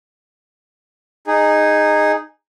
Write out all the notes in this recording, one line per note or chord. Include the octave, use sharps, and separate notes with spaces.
D#4 G#4